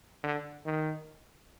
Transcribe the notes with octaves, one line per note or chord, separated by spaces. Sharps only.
D3
D#3